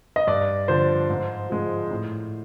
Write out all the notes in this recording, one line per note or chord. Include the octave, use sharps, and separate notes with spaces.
D#5
G2 D5
D3 F3 C5
G#2
F3 G#3
A2